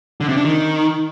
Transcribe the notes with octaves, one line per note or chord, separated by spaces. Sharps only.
D3
C3
D4
D#3